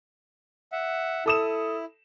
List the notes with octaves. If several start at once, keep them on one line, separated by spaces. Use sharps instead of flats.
E5 F#5
E4 A4 D#6 E7